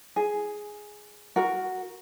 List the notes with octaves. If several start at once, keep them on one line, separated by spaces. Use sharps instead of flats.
G#4
F#4 A#4